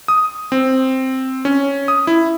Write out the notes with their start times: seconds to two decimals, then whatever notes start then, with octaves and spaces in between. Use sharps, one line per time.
0.08 D#6
0.52 C4
1.45 C#4
1.88 D#6
2.07 E4